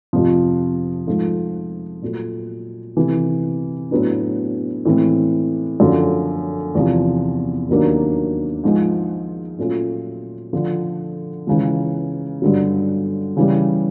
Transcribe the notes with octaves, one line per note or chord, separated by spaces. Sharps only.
F2 C3 F3
G#2 F3 A3
A#2 F#3 A3
C3 E3 A3
A2 F#3 B3 D4
A2 E3 G#3 C4
F#2 D3 F3 A3 C#4
E2 C3 F3
D#2 D#3 F#3 A#3 D4
G#2 F3 G#3
A#2 F#3 A3 C#4 F4
D3 F3 A3 D4
C#2 C#3 E3
G2 D3 F#3
C#3 E3 G3